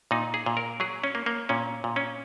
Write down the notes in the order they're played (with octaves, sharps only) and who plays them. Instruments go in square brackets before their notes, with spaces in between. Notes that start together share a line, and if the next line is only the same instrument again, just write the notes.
[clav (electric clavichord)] A#2 D#4
G#4
A#2
A#4
F#3 G#4
C#4
A#3
A#3
A#2 C#4
A#2
C#4